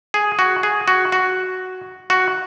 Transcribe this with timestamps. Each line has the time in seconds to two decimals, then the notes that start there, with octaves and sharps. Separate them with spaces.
0.14 G#4
0.39 F#4
0.63 G#4
0.88 F#4
1.12 F#4
2.10 F#4